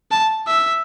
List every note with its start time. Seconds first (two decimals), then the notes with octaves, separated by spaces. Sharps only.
0.11 A5
0.47 E5